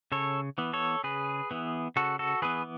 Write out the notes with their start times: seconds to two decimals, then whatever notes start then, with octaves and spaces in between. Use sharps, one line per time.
0.12 C#3 A4 C#5
0.58 E3 B3
0.73 A4 C#5
1.04 C#3 G#4 B4
1.51 E3 B3
1.96 C#3 F#4 A4
2.19 F#4 A4
2.42 E3 B3 G#4 B4